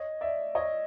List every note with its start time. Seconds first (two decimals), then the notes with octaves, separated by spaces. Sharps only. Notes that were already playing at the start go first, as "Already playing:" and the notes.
Already playing: C#5 D#5
0.21 D5 E5
0.55 C#5 D#5